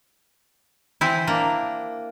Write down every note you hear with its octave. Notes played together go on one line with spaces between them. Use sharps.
E3 C4 E4
A#3 D4